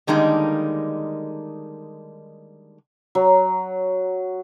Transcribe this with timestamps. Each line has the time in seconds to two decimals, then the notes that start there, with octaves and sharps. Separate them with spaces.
0.07 D3 D#3 G3 G#3 A#3 D#4
3.15 F#3